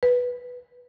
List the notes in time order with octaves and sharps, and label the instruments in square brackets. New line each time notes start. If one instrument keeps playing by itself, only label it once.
[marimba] B4